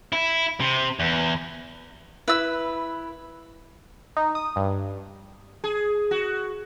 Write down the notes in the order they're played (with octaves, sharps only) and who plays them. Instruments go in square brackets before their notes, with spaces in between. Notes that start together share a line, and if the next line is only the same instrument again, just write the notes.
[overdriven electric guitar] E4
C3
E2
[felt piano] E4 [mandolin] B4 E6
[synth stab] D#4
D#6
G2
[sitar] G#4
F#4